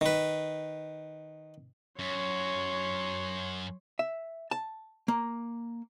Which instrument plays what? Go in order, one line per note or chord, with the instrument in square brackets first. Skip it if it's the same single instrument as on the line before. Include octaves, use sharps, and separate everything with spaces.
[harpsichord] D#3 B4
[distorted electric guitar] F#2 [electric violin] C#5 C6
[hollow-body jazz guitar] E5
A5
A#3